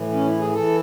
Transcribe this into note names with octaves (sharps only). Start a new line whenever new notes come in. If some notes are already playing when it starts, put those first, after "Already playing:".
Already playing: A2 E3
C#4
E4
G#4
E3 A4